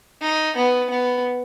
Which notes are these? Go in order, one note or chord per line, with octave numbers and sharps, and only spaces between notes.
D#4
B3
B3